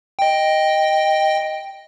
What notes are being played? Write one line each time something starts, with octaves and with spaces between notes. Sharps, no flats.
D#5 G5